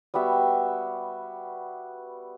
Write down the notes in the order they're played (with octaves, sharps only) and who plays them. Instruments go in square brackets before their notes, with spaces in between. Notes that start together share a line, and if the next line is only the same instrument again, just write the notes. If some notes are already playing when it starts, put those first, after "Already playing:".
[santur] G3 B3 F#4 E5